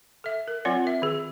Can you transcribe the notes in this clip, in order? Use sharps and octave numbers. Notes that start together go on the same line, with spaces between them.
A4 E5
A#4
F#3 C4 F4 C#5 D5 F#5
A#4 E5
D#3 G#4